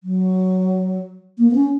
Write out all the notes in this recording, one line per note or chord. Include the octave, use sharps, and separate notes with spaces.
F#3
A#3
B3
C#4